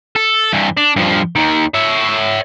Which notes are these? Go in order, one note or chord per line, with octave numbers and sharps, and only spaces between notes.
A4
G2 E3
D4
G2 F3
D#2 D#3
C#5 E5